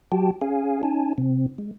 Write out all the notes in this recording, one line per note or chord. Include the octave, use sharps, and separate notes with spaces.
F#3 F#4 G4 G5 A5
C#4 G#4 F5 G#5
C#4 D#4 G#5 A5
C3 C4
G#3